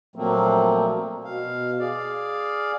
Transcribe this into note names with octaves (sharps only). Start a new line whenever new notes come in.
A#2 F3 F#3 A3 A#3 C4
B2 F5
G#4 D5 F5